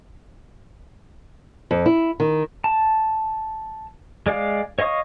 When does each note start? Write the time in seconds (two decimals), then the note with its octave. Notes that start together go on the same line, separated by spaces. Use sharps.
1.71 F2
1.86 E4
2.20 D#3
2.64 A5
4.26 G#3 D5 F5
4.79 C#5 D#5 F5 C#6 D#6